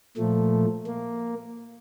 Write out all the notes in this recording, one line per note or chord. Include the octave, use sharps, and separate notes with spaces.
A#2 F3 A3
A#3